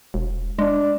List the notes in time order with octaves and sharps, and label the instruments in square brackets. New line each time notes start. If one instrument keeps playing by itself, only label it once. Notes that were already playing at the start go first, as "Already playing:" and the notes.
[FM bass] E1
[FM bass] G#3 [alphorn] D4